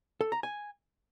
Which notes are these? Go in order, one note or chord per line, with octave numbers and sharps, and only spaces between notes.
A4
A#5
G#5